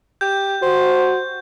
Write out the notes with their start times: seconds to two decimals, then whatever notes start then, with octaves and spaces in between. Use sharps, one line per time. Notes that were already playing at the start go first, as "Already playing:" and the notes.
0.21 G4 G6
0.62 F#4 C5